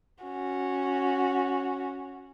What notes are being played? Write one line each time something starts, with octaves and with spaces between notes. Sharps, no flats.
C#4 F#4